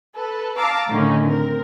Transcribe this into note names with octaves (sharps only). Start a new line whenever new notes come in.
A4 B4
F5 A5 A#5 D6 E6
A2 D3 D#3 C#4 D#4
C4 A#4